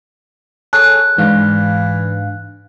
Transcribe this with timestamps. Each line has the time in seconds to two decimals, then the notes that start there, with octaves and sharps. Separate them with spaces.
0.73 G#4 A4 C#5 F#6
1.18 G#2 E3 D4 F5